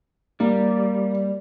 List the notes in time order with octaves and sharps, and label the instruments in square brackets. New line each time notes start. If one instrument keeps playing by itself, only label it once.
[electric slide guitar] G3 [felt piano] A#3